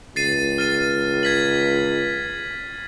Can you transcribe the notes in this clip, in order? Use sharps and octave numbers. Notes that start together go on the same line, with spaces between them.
C#2 A6 C7 D#7
F6 A6 D#7
G#6 B6 F#7